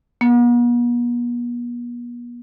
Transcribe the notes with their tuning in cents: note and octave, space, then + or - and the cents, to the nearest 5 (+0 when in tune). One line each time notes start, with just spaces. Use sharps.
B3 -45